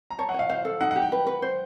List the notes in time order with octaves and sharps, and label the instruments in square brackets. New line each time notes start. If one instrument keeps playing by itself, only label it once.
[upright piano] A#5
[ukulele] C#5 [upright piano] A5
[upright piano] F#5
[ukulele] C#5 [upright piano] F5
[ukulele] C5 [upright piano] F5
[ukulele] A4
[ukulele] D#4 [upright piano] F#5
[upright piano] F#5
[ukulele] G4
[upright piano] G5
[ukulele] B4
B4
C5